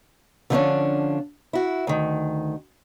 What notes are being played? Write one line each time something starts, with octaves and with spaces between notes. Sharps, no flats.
D3 F3 G#3 B3 C#4 D4
E4 F#4
D2 D#3